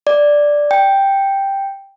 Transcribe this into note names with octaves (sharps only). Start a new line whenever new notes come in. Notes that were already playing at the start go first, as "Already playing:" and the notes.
D5
G5